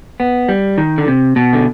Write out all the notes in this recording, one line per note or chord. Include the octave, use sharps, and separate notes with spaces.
B3
G3
D#3
D3
C3
B2
D3